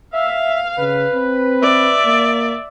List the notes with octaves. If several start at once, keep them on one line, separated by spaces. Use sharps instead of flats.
E5 F5
C#3 B4
C4
D5 E5
A#3